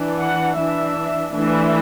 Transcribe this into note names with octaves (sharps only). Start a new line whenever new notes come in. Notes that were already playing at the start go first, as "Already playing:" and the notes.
Already playing: E3 D4
F#5
E3 D4 E5
E3 A3 D4 E5